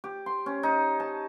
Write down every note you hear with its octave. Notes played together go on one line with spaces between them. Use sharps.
G4
C6
C#4
D#4
A5